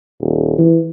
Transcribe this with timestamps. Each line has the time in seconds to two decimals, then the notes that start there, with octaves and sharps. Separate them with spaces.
0.20 D#1
0.58 E3